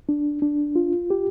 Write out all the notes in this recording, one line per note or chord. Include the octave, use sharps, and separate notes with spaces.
D4
D4
F4
G4